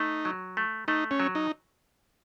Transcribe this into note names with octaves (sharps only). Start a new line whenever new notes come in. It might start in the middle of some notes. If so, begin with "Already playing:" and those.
Already playing: A3 D#4
F#3
A3
A3 D#4
C#4
F#3
D#4